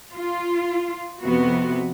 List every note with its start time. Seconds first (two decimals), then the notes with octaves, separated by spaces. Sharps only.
0.14 F4
1.22 F2 C3 B3 F#4